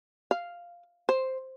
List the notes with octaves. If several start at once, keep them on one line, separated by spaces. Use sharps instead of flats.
F5
C5